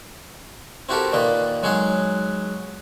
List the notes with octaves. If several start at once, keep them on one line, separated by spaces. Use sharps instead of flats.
C4 E4 F#4 G4 A4 A#4
A#2 D#3 A#3 B4 D#5
F#3 G#3 D#4 G#4 F#5